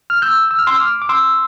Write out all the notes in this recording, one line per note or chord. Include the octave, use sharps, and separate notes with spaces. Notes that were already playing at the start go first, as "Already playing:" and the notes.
F6
E6 G6
E6
F6
C6 E6
D6 F6
D6
C6 E6